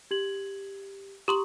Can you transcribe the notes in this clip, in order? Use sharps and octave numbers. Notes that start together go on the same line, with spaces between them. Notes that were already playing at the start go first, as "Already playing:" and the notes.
G4 G#6 F#7
G4 A#5 C6 C#6 D#6 F#7